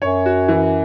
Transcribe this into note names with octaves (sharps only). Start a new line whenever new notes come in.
F#2 C#5
F#4
E3